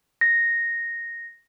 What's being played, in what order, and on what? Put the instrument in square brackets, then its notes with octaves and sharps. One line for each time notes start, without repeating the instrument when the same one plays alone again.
[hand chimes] A#6